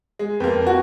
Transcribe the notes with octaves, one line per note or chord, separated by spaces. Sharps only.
G#3
F2 A#3 B4 G5
F4 F#4